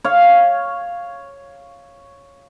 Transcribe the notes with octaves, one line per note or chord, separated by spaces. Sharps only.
C#5 F5